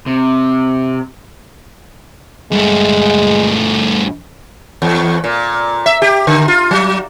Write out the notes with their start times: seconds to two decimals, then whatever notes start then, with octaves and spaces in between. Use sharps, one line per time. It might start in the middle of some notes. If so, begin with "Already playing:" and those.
0.06 C3
2.51 G2 G#3 A3
4.82 E2
5.24 A#2
5.86 E5
6.02 G4
6.27 D3
6.48 F4
6.71 F#3